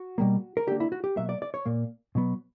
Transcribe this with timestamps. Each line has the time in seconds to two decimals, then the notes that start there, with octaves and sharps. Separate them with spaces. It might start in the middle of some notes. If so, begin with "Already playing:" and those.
Already playing: F#4
0.18 B2 G3 A#3
0.57 A#4
0.67 D3 A#3 G4
0.80 E4
0.92 F#4
1.04 G4
1.16 B2 F#3 A#3 E5
1.29 D5
1.42 D5
1.54 C#5
1.66 A#2 A#3
2.15 B2 F#3 B3